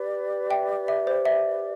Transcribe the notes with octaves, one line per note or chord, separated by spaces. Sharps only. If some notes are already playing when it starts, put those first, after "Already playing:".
Already playing: G4 B4 D5
E5 G5
E5
C5
E5